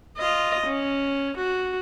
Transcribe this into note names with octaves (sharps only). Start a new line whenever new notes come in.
F4 D#5
C#4
F#4